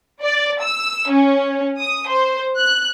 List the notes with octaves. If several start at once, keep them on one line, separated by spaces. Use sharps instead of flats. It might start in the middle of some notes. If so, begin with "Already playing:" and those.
D5
E6
C#4
D#6
C5
F#6